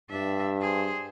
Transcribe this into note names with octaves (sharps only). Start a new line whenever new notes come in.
G2 D4 E5
G#4 C5